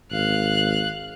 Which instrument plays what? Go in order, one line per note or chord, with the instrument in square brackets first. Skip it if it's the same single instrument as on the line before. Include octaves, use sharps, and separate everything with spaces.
[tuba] G#1 [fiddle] F5 F#6